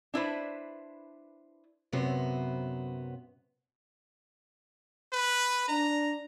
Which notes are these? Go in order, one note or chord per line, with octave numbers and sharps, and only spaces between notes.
D4 E4 B4 C5
F#2 C3 F#3 B3 C5
B4
D4 A#5